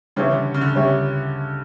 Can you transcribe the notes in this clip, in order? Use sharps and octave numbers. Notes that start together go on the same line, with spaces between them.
C#3 E3 G3 C#4 G4 C#5 E5
D3
C#3
D3
G3 C#4 G4 C#5 E5